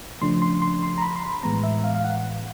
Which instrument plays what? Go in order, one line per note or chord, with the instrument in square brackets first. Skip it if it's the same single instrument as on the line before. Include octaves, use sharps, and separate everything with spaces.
[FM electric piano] C#3 F3 A3 D4 C6
C6
C6
C6
A#5
B5
C6
B5
A2 E3 G#3 B3 A#5
E5
F5
F5
F#5